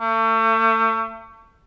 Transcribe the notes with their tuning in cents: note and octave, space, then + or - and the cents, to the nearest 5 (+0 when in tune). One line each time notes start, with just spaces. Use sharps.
A3 +35